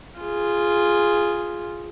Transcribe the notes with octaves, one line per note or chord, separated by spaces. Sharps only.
F4 G#4